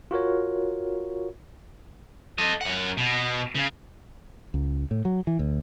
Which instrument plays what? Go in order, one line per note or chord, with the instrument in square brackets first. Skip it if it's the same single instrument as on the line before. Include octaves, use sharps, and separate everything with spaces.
[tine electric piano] F4 F#4 A#4 C#5
[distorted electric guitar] A4 D#5
F#2 F#5
B2
C#3
[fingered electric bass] C#2
A2
F#3
E3
D2